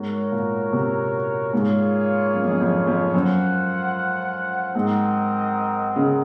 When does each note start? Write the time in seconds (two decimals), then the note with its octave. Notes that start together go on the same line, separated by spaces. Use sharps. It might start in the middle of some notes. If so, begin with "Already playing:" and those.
Already playing: G#2 F#4 A#4 C#5
0.32 A#2
0.72 C3
1.53 G#2 A#3 F4 G#4 C#5
2.34 F#2
2.42 F2
2.51 F#2
2.60 F2
2.87 F2
3.14 F#2 F4 C5 F#5
4.74 G#2 C4 D#4 A#4 D#5 F#5
5.96 C#3